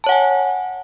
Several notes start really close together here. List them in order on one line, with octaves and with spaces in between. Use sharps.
A5 C#5 F#5 G#5